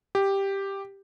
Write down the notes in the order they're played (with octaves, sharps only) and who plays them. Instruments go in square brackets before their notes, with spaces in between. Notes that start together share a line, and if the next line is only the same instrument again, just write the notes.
[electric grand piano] G4